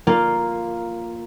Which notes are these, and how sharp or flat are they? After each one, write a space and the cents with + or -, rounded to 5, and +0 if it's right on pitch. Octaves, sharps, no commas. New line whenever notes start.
A#3 +0 F4 +0